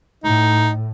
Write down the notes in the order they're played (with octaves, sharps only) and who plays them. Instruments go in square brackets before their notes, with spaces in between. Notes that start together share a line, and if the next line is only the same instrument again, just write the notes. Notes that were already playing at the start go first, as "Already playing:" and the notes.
[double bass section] A2 [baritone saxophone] D#4